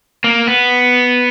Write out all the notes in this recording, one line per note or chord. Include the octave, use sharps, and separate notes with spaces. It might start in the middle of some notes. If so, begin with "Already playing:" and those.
A#3
B3